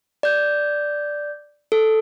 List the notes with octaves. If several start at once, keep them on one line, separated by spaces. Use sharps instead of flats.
D5 G6
A4